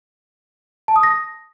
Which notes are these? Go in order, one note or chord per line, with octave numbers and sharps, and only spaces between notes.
A5
D#6
A#6